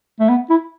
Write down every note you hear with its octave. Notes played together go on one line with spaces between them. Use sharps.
A3
B3
E4